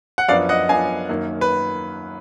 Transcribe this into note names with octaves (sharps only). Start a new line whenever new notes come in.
F#5
F#2 F3 B3 D4 D5 F5
D#5 F#5
F#2 F3 B3 D4 F5 G#5
F#2 D#3 A#3
B4